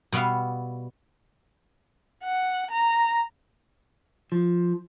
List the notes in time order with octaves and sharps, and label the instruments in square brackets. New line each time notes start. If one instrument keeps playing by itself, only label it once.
[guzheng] B2 G3 B3 E5 F5
[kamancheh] F#5
A#5
[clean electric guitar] F3